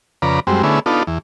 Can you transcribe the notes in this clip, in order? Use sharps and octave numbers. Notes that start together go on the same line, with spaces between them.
F2 C#3 B4 D5 A#5
F#2 G3 G#3 C4
D3 A3 B3 C#4 E4 G#4
B3 D4 D#4 F4 A4
E2